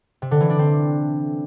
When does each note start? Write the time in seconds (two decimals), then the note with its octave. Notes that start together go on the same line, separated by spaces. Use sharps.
0.22 C3
0.31 D3
0.40 E3
0.50 D4
0.59 C4